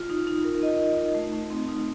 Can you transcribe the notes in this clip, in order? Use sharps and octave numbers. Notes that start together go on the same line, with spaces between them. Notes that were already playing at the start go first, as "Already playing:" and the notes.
Already playing: F4
D#4
D#4
A#4
D#5
D#4
D#4
A3
A3
C4
D#4